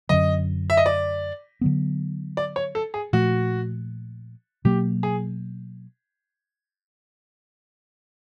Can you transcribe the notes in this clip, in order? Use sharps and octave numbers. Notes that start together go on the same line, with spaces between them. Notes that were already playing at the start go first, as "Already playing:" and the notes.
F#2 D3 F#3 D#5
E5
D#5
D5
D3 F#3 B3
D5
C#5
A4
G#4
A#2 F3 A3 F#4
B2 F#3 A#3 G4
G#4